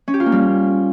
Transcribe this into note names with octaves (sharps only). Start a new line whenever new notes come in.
C#4
G4
F4
A#3
G3